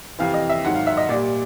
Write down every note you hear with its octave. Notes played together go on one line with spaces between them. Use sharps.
F2 C3 E3 F5
D#5
E5
G#2 D#3 F#3 F#5
F5
E5
D#5
A#2 G3 D5